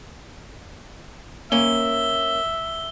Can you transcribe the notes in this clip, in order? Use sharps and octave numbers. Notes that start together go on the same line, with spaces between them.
A#3 C#4 E5 G7